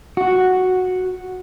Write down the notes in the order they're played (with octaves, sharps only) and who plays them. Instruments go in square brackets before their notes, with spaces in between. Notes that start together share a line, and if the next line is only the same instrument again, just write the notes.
[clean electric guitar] F#4